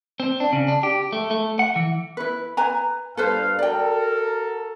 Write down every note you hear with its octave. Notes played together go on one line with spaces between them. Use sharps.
C4
D4
C#3
D4
G4
A3
A3
F#5
E3
E4 B4
B4 G#5 A#5
G2 A4 B4 C5 F5
F#4 A4 A#4 D5 G5